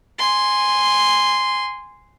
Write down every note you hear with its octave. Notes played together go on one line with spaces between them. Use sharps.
G#5 C6